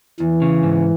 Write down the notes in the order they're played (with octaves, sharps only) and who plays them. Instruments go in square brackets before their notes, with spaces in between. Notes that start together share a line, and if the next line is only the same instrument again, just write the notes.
[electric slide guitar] E2 [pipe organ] E3
[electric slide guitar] C#3
G#2